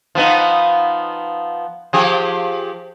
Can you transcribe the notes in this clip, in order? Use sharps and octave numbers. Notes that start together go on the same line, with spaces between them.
F3 B3 D#4
F3 G4 G#4